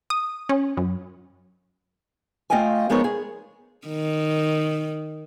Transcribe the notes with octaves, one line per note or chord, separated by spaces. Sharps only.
D#6
C#4
F#2
A3 F4 D#5 F5 G5 G#5
F3 G#3 B3 D#4 A#4 C#5
G#4
D#3